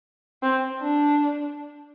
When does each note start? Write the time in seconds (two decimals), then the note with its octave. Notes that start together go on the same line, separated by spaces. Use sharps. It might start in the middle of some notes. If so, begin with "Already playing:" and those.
0.42 C4
0.81 D4